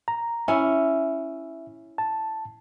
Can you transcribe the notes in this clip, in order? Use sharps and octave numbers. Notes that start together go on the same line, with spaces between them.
A#5
C#4 E4 E5
A5